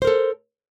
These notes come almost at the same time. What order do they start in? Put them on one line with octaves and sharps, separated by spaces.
C5 A#4 A4